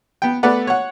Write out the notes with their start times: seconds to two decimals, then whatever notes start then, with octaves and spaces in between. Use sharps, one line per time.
0.22 B3 G5
0.43 A3 B3 B4 D5 F#5
0.67 C#5 F#5